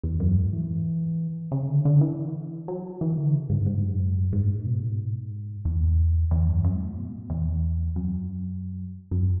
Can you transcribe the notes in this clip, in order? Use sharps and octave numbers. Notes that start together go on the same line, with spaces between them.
E2
F#2
G#2
E3
C#3
D3
D3
E3
F#3
E3
D3
C#3
G#2
G#2
F#2
G#2
A2
B2
G#2
E2
E2
F#2
F#2
G#2
A2
B2
A2
E2
F#2
F#2